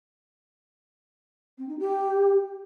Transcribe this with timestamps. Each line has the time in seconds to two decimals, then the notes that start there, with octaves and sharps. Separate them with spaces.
1.58 C4
1.69 D#4
1.79 G4